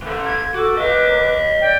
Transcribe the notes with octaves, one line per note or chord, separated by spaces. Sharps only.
E3 A4
G#6
F#4 A4 D6
B4 D#5 F5
D5 G5